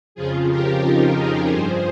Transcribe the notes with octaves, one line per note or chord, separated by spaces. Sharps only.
F2 C#3 F3 F4 G#4
G4 A#4
D#4 G4
F4 G#4
G2 F3 G#4 C5